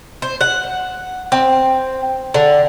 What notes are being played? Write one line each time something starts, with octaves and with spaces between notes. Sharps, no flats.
C5
F#5
C4
D3